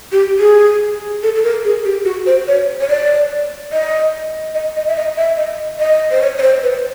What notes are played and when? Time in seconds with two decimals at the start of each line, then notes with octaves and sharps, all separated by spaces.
0.12 G4
0.39 G#4
1.23 A4
1.36 A4
1.44 A#4
1.65 G#4
1.85 G4
2.05 F#4
2.26 C5
2.48 C#5
2.80 C#5
2.89 D5
3.72 D#5
4.54 D#5
4.76 D#5
4.88 E5
4.96 D#5
5.17 E5
5.38 D#5
5.79 D#5
6.11 C5
6.22 C#5
6.38 C#5
6.42 C5
6.63 B4